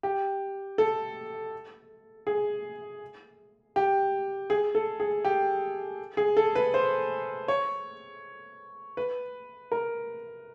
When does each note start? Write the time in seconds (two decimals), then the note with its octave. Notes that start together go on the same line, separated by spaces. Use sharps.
0.03 G4
0.78 A4
2.27 G#4
3.76 G4
4.50 G#4
4.75 A4
5.00 G#4
5.25 G4
6.17 G#4
6.37 A4
6.55 B4
6.74 C5
7.48 C#5
8.97 B4
9.72 A#4